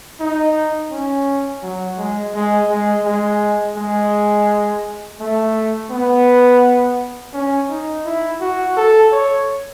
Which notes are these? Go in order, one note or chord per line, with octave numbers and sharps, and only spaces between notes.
D#4
C#4
F#3
G#3
G#3
G#3
G#3
G#3
A3
B3
C#4
D#4
E4
F#4
A4
C#5